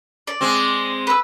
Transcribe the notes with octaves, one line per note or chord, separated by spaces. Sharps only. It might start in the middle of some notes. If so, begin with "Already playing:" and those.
D5
G#3 C4
B4 E6